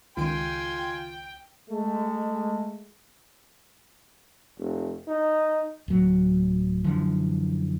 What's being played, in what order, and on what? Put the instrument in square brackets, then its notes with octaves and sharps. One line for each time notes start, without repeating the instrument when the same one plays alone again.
[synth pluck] C#2 D#3 D7 [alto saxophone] F4 [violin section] G5 [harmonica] G#5 C6
[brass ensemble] G#3 A3
[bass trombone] F1
D#4
[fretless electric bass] D1 F#3
F#2 D3 E3 F3